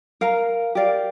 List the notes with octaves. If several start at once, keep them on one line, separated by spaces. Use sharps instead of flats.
A#4 F5 A#5
G4 A#4 D5 F5